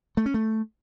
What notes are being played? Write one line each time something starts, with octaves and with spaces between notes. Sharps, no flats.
A3
C#4
A3